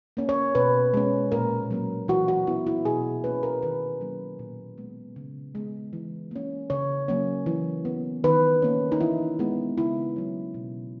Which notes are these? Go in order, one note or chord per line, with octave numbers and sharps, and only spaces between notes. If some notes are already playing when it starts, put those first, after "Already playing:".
A#3 C#4
C#5
B2 B4
G#3 C#4
A#2 A#4
F#3 A#3 C#4
E3 F#4
F#4
B3 E4
E4
B2 G#4
A#3 C#4 B4
A#4
D#3 B4
F#3 A#3 C#4
A#2
G#3 B3
C#3
G#3 B3
E3
A#3 C#4
C#3 C#5
F#3 A#3 C#4
E3
B3
D#3 B4
A#3 C#4
D#4
E3 E4
G#3 B3
C#3 E4
F#3 C#4
B2